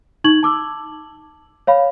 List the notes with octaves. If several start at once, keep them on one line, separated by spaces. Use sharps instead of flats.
D#4 C#6 G#6 F#7
A5 D6 E6
C#5 F5 B5